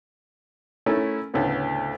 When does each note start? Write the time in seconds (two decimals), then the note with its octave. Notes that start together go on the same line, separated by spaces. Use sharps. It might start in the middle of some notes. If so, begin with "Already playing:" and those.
0.86 A3 C#4 E4 A#4
1.34 D2 A2 C#3 A3 B3